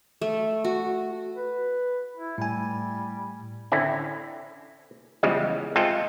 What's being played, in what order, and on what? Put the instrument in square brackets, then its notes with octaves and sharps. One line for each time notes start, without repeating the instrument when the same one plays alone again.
[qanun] A3
F#4
[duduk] B4
E4
[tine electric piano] A2 G#5 [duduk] G3
[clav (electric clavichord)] D3 C4 C#4 E4
E2 C#3 F3 G3 G#3
G#3 C4 F4 A4 E5 G5